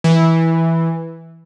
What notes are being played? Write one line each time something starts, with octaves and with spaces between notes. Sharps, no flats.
E3